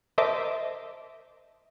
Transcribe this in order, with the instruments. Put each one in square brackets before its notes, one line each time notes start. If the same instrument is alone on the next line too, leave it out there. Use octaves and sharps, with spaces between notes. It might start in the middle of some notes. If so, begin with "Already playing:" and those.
[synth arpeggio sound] A#4 C5 D#5 E5 A5 D6